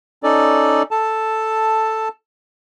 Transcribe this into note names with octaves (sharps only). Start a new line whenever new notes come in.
C#4 D#4 A4 D5
A4 A5